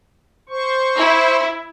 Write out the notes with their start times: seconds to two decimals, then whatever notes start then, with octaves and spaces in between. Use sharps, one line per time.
0.49 C5 C#6
0.96 E4